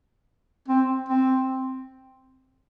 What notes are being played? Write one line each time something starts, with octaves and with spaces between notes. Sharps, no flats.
C4
C4